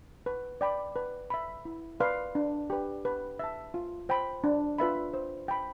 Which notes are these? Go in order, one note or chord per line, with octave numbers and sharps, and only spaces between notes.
B4
D5 G5 B5
B4
E5 B5
E4
B4 D5 F5 C6
D4
G4 B4
B4
E5 A5
F4
C5 G5 B5
D4
F4 B4 E5 B5
C5
G5 B5